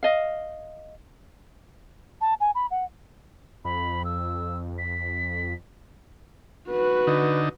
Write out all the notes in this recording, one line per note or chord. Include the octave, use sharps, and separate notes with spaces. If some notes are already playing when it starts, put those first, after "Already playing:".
D#5 F5
A5
G#5
B5
F#5
F2 B5
E6
B6
F#4 B4
D3 D#4